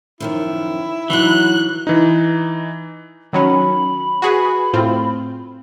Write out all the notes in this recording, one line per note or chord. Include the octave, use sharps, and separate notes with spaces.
F#2 D#3 F3 E4
E3 F#3 D#4 F#4 F#6
E3 D#4
D#3 F#3 C#4 B5
F#4 G#4 B4
A2 C4 F4